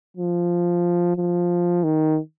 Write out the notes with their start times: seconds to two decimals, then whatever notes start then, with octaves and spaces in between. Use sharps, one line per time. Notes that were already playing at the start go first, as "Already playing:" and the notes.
0.17 F3
1.16 F3
1.83 D#3